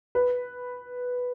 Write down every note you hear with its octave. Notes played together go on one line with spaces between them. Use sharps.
B4